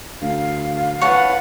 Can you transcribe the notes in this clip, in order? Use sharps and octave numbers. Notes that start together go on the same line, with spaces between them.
D2 F5
B4 C#5 F#5 A5